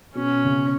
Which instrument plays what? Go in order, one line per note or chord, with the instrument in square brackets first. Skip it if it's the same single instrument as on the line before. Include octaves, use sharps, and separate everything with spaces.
[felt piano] B2 [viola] C#4
[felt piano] C#3